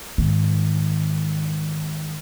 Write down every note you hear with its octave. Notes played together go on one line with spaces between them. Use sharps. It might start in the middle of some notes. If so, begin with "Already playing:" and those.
G#2 D#3